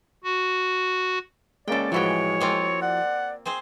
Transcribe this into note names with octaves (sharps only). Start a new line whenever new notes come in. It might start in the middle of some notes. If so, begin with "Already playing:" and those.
F#4
G#3 A#3 C#4 A4 D5 G5
A2 E3 F3 G#3 E4 F#4 C#5 G5
A#3 C4 F4
D5 F#5
C4 G#4 C5